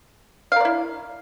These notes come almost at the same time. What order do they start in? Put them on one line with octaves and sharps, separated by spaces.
F5 A#4 D5 E4